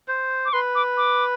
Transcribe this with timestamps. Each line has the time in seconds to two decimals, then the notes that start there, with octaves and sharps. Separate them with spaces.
0.08 C5
0.45 D6
0.53 B4 C6
0.75 D6
0.97 D6